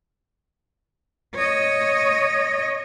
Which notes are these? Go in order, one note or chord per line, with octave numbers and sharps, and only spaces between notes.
C#5 D#5